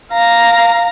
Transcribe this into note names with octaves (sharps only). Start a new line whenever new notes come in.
F5 A#5